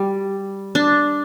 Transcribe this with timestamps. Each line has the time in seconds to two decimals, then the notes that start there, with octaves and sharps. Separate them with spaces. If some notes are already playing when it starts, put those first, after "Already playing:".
Already playing: G3
0.75 D4